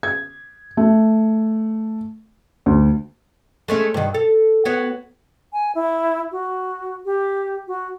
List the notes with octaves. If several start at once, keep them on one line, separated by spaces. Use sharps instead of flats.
G#6
A3
D2
G#3 A3 C#4
G2 D#3
A4
B3 F#4 C#5
G#5
E4
F#4
G4
F#4